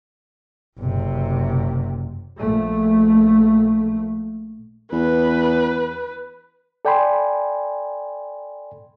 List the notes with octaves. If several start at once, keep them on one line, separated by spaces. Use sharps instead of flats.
F#1 C3
A#1 A3
E2 B4
A4 D5 G5 G#5 B5 C6